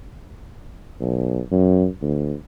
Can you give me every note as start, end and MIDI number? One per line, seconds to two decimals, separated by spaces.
1.00 1.39 35
1.51 1.87 42
2.02 2.33 38